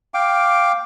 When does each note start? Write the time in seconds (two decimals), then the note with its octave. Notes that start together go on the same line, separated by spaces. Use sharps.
0.14 F5 G5 D6